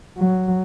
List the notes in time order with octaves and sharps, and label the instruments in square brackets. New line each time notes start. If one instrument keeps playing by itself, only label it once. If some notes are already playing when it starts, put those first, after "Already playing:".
[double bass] F#3